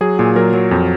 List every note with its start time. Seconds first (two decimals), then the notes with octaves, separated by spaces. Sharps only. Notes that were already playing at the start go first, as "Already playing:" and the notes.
0.01 F#3 G#4
0.19 A#2 G#4
0.36 F#3 A#4
0.53 F#3
0.71 F2